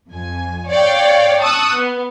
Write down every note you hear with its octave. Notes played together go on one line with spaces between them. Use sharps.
F2 G#5
C#5 D5 F5 G5
A5 C#6 D#6 E6 F#6
B3